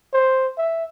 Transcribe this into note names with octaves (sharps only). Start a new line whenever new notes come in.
C5
E5